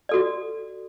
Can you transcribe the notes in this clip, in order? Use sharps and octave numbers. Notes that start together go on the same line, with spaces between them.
F#4 A4 D5